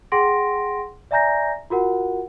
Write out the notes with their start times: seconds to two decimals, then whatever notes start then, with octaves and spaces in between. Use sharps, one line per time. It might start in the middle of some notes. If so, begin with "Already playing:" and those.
0.12 G#4 F#5 G5 C6 A#6 D7
1.11 D5 E5 G#5 A#5 G6 A#6
1.70 F4 F#4 A#4 F#5